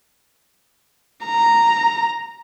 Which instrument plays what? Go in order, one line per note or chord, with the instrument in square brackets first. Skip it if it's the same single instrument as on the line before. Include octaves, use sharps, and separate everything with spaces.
[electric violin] A#5